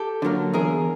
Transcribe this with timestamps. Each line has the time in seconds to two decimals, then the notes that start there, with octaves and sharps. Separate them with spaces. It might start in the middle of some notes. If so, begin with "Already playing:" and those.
Already playing: G4 A4
0.22 D3 F#3 A#3
0.53 E2 G#4 A#4